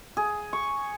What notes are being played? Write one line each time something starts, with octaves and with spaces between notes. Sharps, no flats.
G#4
C#6